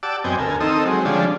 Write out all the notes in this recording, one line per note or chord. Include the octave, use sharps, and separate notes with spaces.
G4 D5 F#5 A5 D6 E6
F#2 B3 C4 D#5 G5 G#5
D2 A4 A#4 G#5
D#3 C4 D#4 A4 D#6 E6
F#3 G#3 C4
D3 F3 G3 G#3 C#4 D4